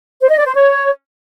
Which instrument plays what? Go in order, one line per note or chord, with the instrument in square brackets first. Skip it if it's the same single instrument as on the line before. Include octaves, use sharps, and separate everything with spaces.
[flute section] C5
D#5
D5
C5
C#5